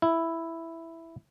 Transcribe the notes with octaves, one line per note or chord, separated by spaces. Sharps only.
E4